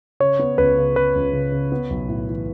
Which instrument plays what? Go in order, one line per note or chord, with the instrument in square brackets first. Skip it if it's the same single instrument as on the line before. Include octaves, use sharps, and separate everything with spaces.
[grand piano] C#3 [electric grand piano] C#5
[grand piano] B3
[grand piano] C#2 [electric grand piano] B4
[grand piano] C#3
[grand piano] C#3 [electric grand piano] B4
[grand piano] C#2
C#3
C#3
B3
B1
A2
E3